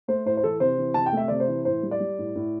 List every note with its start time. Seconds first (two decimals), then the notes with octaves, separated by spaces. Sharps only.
0.08 A3 C5
0.26 A2 C5
0.37 C5
0.44 E3 A4
0.60 C3 C5
0.78 E3
0.94 C3 A5
1.06 G5
1.13 A3 E5
1.28 C3 D5
1.40 C5
1.48 E3
1.65 A2 C5
1.83 G3
1.91 D5
2.00 G3
2.19 A2
2.36 A2